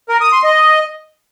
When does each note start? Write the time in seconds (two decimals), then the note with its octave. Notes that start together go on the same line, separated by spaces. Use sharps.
0.09 A#4
0.21 D#6
0.32 C6
0.44 D#5